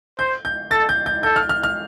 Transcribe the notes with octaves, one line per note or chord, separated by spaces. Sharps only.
C5 G6
G6
A4 A6
G6
G6
A4 G6
F6
F6
F6